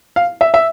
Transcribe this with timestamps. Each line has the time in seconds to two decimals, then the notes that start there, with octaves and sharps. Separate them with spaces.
0.16 F5
0.41 E5
0.54 E5